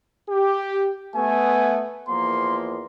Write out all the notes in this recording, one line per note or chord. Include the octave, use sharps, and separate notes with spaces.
G4
A3 B3 G#5
E2 F3 A#3 C6